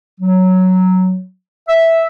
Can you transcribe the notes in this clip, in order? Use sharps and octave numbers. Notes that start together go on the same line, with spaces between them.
F#3
E5